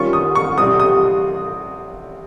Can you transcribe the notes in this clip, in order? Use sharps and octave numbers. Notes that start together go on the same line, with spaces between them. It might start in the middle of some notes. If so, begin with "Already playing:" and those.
Already playing: D#3 G3 C#4 F4 C#6
D#6
C#6
C3 G3 C4 D#6
D#6